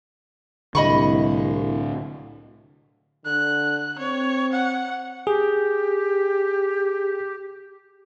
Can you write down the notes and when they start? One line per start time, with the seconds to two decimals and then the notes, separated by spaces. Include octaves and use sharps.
0.75 C2 A2 D3 D#5 B5 C#6
3.26 D3 F#6
3.98 C4 C#5
4.52 F#5
5.27 G4 G#4